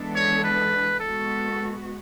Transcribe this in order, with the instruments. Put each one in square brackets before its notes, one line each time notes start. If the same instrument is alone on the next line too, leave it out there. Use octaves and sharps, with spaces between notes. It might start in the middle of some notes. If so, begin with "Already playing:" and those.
Already playing: [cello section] E3 G#3 B3 D4 A4
[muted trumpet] C#5
B4
[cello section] G#3 B3 F#4 [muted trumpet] A4